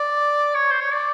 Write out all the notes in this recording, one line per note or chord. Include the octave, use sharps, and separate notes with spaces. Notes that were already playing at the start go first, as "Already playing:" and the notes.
Already playing: D5
C#5
C5
C#5
D5